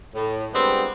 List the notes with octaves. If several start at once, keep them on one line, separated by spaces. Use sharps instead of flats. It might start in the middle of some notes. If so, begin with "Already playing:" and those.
A2
D3 G3 G#3 B3 C4